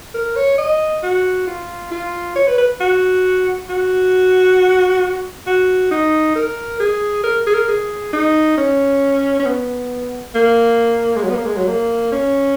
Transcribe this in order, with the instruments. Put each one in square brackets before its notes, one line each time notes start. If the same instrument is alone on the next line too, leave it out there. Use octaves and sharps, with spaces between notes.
[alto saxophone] A#4
C#5
D#5
F#4
F4
F4
C#5
B4
B4
F#4
F#4
F#4
D#4
A#4
G#4
A#4
G#4
A#4
G#4
D#4
C#4
C#4
B3
A#3
G#3
F#3
B3
A#3
G#3
F#3
A#3
C#4